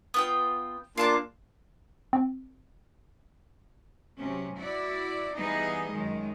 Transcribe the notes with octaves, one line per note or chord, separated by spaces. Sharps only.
B3 F4 G5
A#3 D4 F4 F5 A5 D6
C4
C3 F#3 C#4
E4 F#4 D5
E3 G3 B3 D#4 G#4 D#5
F#2 D#3 G#3